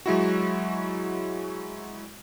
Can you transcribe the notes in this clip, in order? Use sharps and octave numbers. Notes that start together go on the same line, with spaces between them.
F#3 G#3 E4 F#4